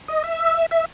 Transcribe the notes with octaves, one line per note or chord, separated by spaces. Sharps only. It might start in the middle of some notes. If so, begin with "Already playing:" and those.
D#5
E5
E5